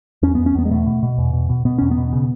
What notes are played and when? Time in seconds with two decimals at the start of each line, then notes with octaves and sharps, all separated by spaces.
0.22 E2 C#4
0.35 B3
0.39 E2
0.46 C#4
0.55 E2 B3
0.65 G#3
0.71 B2 A3
0.86 B2
1.03 B2
1.18 E2
1.33 B2
1.49 B2
1.65 B2 B3
1.78 E2 C#4
1.91 B3
1.98 B2
2.13 C#3